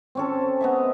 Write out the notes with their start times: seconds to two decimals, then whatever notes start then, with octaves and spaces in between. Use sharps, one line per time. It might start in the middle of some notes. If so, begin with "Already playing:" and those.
0.15 C4 C#4 A4
0.61 B3 D#5 E5